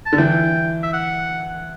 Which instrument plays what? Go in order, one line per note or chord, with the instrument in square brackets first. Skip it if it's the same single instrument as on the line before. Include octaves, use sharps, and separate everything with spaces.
[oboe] A5
[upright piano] D3
[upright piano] E3 [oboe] G5
[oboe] E5
F#5